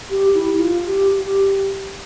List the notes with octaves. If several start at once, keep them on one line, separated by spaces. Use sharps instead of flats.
G4
E4
F4
G4
G4